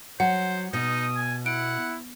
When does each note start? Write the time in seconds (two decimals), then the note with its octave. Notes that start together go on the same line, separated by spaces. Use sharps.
0.20 F#3 C5 F#5
0.73 B2 D#4 D#6
1.17 G#5
1.46 E4 F#5 D7